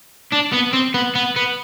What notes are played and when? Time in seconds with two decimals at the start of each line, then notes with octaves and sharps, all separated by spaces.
0.33 D4
0.54 B3
0.74 C4
0.94 B3
1.15 B3
1.36 B3